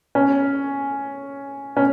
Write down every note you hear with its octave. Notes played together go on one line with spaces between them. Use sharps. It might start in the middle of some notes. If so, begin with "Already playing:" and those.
C#4
C#4